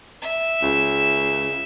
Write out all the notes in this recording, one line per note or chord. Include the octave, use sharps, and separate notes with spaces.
E5
C#2